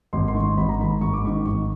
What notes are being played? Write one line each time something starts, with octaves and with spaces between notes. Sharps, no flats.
G#1 C6
C6
G#2 D#3 C#6
G#1 B5
A#5
G#2 D#3 B5
G#1 C#6
D6
G#2 D#3 C#6
G#1 C#6